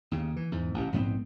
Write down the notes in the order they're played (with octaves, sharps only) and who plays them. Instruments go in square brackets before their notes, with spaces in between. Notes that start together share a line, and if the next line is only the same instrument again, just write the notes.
[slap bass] D#2 C#3
E3
E2 G#2
A1 C3
A#1 G#2 B3 C4